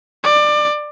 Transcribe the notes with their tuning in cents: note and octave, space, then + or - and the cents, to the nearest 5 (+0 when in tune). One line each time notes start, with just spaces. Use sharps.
D5 +25